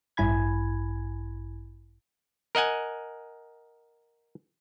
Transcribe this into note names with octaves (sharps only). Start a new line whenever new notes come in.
A1 G2 E4 G#5 B5 G#6
A#4 D#5 F#5 G#5